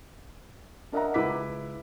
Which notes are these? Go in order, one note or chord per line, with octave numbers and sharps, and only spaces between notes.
D4 A#4 D#5 E5 F#5 A#5
C#2 E4 B4 E5 D6 B6